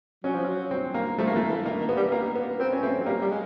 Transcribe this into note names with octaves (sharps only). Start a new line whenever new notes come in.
F#3 C#4
F3
F#3
C4
A#3
F3 A3
A#3
E3 A3
E3
D#3 A#3
D#3
B3
G3
A#3
B3
B3 C4
C#4
A3 C4
F#3
G3 A#3
G3
G#3